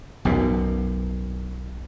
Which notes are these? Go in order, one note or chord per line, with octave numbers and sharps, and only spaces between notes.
B1 F#2 B2